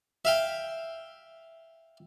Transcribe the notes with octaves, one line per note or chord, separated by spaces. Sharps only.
E5 F5 G5